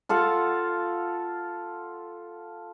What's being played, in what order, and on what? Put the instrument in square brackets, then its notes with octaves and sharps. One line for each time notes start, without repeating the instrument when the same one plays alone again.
[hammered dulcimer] F4 A4 F5 F#5